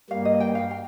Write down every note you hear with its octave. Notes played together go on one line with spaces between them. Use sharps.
G2 G3 A#3 F5
D#5
G5
F5
G5